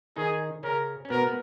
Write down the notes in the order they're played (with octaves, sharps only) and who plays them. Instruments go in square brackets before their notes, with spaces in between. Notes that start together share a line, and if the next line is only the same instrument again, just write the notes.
[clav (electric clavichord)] D#3 D#4 [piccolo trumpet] G#4
[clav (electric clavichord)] C#3 C#4 [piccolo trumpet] A#4
[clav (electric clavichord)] C#4
[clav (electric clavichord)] B2 B3 [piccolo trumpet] A#4
[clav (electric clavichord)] B3